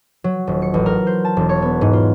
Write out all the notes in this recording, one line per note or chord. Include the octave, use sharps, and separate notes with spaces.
F#3
D#1
C#7
A1
A#4
C5
A5
E1
C#5
B3
G#2
F4